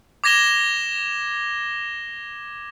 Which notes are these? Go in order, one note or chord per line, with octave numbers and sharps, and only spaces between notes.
D6 G#6 A#6 E7 G7